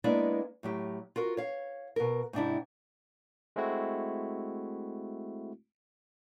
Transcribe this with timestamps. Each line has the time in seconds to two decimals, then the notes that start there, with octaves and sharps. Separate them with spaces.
0.04 G#3 A#3 B3 D4 E4 D5
0.63 A2 F#3 G4
1.16 F4 F#4 A#4
1.37 C#5 F5
1.96 B2 A#4
2.33 G#2 C3 D4 E4
3.56 G#3 A3 C4 E4 F#4